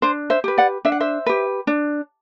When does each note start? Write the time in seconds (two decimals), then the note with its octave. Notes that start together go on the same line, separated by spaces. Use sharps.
0.02 D4 C5
0.30 C5 E5
0.44 G4 B4
0.58 D5 F#5
0.85 D4 E5
0.92 F#5
1.00 C5 E5
1.26 G4 B4
1.67 D4